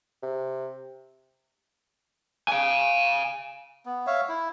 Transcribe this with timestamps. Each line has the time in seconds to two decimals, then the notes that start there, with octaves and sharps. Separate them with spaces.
0.23 C3
2.48 F5 G#5
3.86 B3
4.07 C#5 E5 F5
4.29 E4